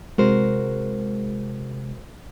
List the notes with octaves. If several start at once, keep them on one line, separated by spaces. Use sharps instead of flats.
C3 G#3 F#4 A#4 C5